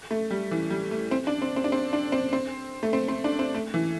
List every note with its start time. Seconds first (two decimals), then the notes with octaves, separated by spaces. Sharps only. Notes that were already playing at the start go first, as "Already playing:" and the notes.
0.11 A3
0.30 G3
0.51 E3
0.70 G3
0.91 A3
1.11 C4
1.27 D4
1.42 C4
1.56 C4
1.64 D4
1.72 C4
1.93 D4
2.12 C4
2.33 C4
2.83 A3
2.93 C4
3.08 C4
3.24 D4
3.39 C4
3.54 A3
3.74 E3